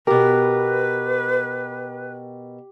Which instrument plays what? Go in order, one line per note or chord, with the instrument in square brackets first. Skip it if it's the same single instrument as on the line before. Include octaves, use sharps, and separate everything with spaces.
[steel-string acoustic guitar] B2 A#4 [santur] G4 [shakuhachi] B4